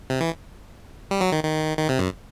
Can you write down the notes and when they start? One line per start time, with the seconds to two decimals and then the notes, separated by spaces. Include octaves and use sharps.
0.10 C3
0.21 E3
1.11 G3
1.21 F#3
1.32 D#3
1.44 D#3
1.78 D#3
1.89 C3
1.99 F#2